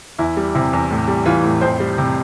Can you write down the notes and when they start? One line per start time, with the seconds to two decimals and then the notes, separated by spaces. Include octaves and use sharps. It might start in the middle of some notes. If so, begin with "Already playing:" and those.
0.19 E2 E4
0.37 G3
0.55 C3 E4
0.73 E2
0.91 A2
1.08 G3
1.26 E3 F4
1.44 A2
1.61 F2 C4 C5
1.80 G3
1.98 C3